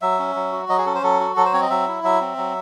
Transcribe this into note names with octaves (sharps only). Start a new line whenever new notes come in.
F#3 E5
C#4
F#3
F#4
F#3 D#5
G#4
C#4 A4
C5
F#3 A4
F#4
F#3 A4
C5
C4 C#5
D#5
F#3 E5
E4
F#3 E5
C4
F#3